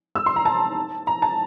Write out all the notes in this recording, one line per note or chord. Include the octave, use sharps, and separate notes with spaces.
E6
C6
A#5
A5
A#5
A5